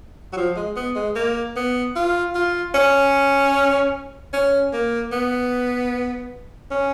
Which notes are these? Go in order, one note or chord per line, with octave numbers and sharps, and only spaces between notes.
F#3
F3
G#3
B3
G#3
A#3
B3
F4
F4
C#4
C#4
A#3
B3
C#4